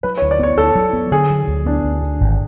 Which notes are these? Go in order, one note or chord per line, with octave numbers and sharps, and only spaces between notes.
F#3 B4
C#5
D2
D5
B3 C#5
D2 A4
F#3
B3
D3 G#4
F#3
D2
B3 D4
D2
D3
G#1